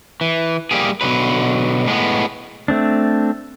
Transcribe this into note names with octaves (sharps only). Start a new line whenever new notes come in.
E3
G3 A#3 G4 G#4
B2 D3 F#3 B4
A2 G#3 A#3 B3
A3 C4 D4